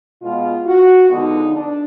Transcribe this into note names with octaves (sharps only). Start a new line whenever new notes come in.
B2 G#3 B3 F4
F#4
D3 F3 G#3 B3 D#4
D4